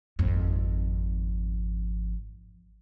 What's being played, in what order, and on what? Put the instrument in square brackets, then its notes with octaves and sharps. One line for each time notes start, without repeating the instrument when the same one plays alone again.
[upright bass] G#1 F2